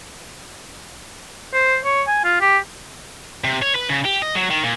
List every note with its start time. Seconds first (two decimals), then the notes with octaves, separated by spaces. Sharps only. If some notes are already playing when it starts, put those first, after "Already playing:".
1.53 C5
1.83 C#5
2.07 G#5
2.24 F4
2.41 G4
3.44 C3
3.62 C#5
3.76 B4
3.90 C#3
4.05 G4
4.22 D#5
4.35 F#3
4.50 D#3
4.63 A#2